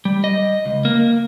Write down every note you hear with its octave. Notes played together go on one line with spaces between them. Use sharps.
G3
D#5
C#2
A#3